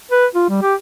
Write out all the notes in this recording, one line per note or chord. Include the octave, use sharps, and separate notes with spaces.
B4
F4
G3
G4